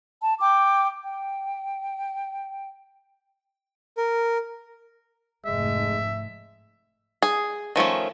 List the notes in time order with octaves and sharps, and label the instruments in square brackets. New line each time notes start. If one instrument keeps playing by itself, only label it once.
[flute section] A5
G5 D6
G5
[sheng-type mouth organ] A#4
[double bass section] F1 G#2 A3 [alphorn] G#3 [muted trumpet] E5
[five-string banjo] G#4
D#3 F3 A3 C#4